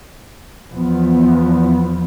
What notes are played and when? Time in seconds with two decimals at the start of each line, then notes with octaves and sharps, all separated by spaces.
0.72 E2 F3 B3